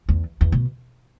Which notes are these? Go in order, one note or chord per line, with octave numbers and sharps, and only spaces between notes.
E2
E2
B2